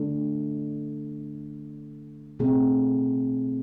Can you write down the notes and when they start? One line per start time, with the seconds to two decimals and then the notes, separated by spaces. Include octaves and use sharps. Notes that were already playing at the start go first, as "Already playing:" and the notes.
Already playing: D3 A3 D4 A4
2.39 B2 A3 C4 G#4